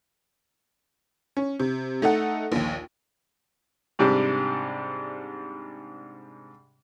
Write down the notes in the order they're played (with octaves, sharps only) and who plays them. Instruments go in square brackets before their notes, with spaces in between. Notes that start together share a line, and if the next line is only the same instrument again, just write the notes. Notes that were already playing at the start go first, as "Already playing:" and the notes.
[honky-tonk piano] C#4
C3
A3 D#4 A4 F#5
A#1 D#2
[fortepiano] G#2 C3 G3 D4